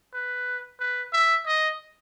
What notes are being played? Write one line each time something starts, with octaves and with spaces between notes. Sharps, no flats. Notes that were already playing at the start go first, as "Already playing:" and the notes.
B4
B4
E5
D#5